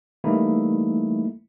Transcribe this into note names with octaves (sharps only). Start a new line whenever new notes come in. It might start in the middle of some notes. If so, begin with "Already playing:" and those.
E3 G3 A3 A#3 D#4 E4